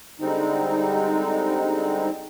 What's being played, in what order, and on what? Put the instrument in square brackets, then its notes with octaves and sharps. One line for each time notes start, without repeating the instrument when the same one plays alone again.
[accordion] D3 G3 G#3 C4 D#4